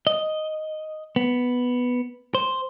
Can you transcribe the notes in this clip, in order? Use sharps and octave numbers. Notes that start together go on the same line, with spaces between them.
D#5
B3
C5